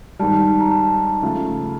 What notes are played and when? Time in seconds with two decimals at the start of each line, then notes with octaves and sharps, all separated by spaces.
0.19 G#2 D#3 G3 A5
0.60 A#5
0.71 A5
1.22 C#3 F3 A3